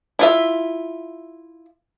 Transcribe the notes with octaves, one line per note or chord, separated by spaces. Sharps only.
E4 F4 E5